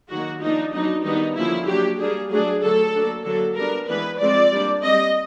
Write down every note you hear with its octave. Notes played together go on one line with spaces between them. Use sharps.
D#3 F#3 A#3 F#4
F3 A#3 D4 D#4
F#3 B3 D4 D#4
D#3 G3 B3 D4 D#4
D3 F3 A#3 C#4 E4
F#3 A#3 D4 G4
G3 A#3 D4 G#4
F#3 A3 D4 G#4
D3 F#3 A3 A4
F#3 A#3 D4
D3 F#3 A#3 A4
G3 B3 D4 A#4
E3 G#3 B3 D4 B4
F3 G#3 C4 D5
G3 A#3 D4
G3 C4 D#5